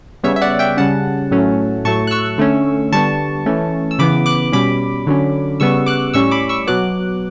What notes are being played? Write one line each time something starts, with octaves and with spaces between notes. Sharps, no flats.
C#3 G3 B3 C#5 E5
E5
D5 F#5
E5 G5
C#3 G3 C#4 F#5 A5
A2 F#3 A3 C#4
A2 F#3 A3 A5 C#6
F#6
C#6 E6
D3 A3 C#4
D3 G3 B3 A5 C#6
E3 A3 C#4
E6
C#3 E3 B3 B5 D6
D6 F#6
B2 G3 C#4 B5 D6
D3 F#3 C#4
C#3 G3 B3 C#6 E6
D6 F#6
A2 G3 C#4 C#6 E6
B5 D6
C#6 E6
B2 F#3 B3 D6 F#6